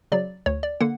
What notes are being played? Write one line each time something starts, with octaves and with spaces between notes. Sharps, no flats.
C#3 F#3 D5
D2 C#5
D5
D3 A#3 F#5